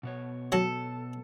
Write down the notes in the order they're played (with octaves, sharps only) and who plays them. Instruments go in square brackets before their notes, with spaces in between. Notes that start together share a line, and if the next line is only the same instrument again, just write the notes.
[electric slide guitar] B2 B3 C#5
[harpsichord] F#3 [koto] A4